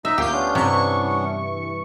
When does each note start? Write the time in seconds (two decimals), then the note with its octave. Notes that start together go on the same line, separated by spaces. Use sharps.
0.05 D#4 D#5 E5
0.18 D2 A#3 F4 G4 G6
0.32 B3 C#4 D4
0.55 G2 C3 E3 C#6